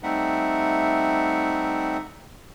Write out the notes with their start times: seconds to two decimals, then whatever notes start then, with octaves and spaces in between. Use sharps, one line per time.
0.03 G3 A3 C4 D#4 E5 F#5